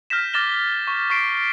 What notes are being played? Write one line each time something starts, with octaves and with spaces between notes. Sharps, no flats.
F6 G6 A#6 B6 E7
D6 F6 A6 A#6 E7 G7
C#6
C#6 D6 B6 C7 D7